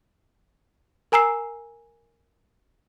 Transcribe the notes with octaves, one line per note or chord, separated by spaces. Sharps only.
A#4 G#5 A#5 E6 C7